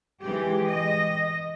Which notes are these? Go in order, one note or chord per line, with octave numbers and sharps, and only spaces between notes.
E3 G#3 G4
D#5